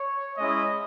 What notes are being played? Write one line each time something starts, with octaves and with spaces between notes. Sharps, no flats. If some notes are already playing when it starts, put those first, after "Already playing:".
Already playing: C#5
G#3 C#4 E4 D#5